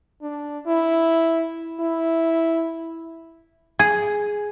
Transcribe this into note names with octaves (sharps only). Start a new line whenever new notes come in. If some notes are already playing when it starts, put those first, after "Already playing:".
D4
E4
E4
G#4